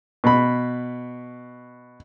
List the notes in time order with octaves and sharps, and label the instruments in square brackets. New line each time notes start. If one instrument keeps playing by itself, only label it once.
[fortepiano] B2 B5